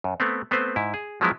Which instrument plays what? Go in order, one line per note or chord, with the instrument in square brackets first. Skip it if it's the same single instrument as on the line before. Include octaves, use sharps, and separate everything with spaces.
[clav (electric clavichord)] F#2
A3 B3 C4
A3 B3 C4 B4 C5
G#2 E4
G#4
F3 F#3 G#3 B3 E4